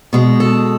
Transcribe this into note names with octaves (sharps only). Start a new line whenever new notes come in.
B2 G#3
A4